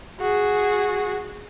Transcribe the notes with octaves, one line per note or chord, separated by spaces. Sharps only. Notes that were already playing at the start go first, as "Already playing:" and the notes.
F#4 G#4